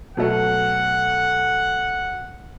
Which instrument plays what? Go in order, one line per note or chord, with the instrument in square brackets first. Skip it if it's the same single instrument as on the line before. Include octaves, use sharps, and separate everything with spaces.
[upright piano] B2 F#3 A3 [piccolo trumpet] F#5